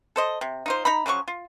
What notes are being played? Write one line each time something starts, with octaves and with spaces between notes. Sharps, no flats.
A4 C5 D#5
C3
D#4 F4 C5
D#4 A#5 B5
C#3 F3 F#3 C#6
F4